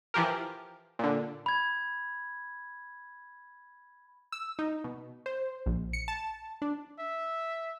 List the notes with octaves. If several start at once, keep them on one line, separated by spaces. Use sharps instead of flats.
E3 F3 G4 A#4
A#2 D3
B5 G#6
E6
D#4
B2
C5
A#1
C#7
A5
D4
E5